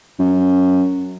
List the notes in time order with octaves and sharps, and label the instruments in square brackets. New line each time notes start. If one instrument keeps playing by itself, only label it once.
[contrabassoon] F#2